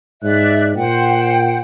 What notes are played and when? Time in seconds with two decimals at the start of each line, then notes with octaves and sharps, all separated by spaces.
0.23 G#2 D5 E5 F#6
0.76 A#2 C5 F#5 G5